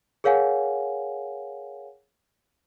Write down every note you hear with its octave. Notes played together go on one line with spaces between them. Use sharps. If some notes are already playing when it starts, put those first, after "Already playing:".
G#4 A#4 C#5 F5 F#5 G#5